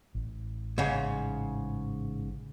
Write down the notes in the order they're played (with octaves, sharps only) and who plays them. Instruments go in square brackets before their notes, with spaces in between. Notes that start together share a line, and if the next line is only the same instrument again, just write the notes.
[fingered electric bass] A1
[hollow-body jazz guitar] G#2 C#3